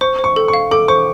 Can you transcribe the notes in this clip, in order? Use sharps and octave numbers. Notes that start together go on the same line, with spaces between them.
C5 C#6
C5
C#6
A4
C#6
F5
A4 D6
C5 C#6